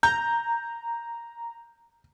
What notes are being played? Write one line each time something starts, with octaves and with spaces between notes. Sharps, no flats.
A#5 G6